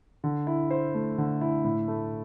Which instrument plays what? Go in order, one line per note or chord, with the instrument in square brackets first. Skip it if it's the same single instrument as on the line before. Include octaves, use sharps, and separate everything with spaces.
[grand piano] D3
E4
C5
A3
D3
E4
A2
A3